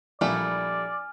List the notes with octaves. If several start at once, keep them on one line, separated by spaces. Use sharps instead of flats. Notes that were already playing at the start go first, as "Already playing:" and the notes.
A#1 G3 A3 E4 D5 G#5 F6